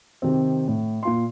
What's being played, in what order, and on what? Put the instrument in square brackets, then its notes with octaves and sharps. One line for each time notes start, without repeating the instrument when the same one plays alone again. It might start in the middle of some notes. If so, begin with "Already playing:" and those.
[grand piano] C3 D#3 C4
A2
A#2 F4 C6